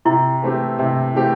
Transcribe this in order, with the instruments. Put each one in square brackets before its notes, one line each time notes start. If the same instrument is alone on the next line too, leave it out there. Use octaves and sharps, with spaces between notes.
[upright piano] C3 [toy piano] E4
[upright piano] E3 A3 C4 G4
C3
E3 A3 C4 G4